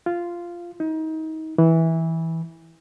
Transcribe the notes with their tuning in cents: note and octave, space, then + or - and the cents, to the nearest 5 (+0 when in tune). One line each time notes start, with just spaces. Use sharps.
F4 -10
D#4 +30
E3 -15